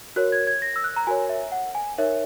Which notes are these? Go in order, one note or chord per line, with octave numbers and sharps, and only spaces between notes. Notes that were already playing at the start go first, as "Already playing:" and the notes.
F#4 A#4 C#5 F#6
G#6
G#6
A#6
E6
F#6
A#5
F#4 A#4 C#5 G#5
E5
F#5
G#5
D#4 A#4 C#5 E5